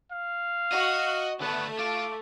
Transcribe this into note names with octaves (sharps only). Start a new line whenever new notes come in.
F5
F#4 D#5
D3 A3 B3 B4
F4 D6